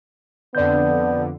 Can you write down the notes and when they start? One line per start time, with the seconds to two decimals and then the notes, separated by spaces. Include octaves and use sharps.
0.55 F2 D3 B3 D5 G6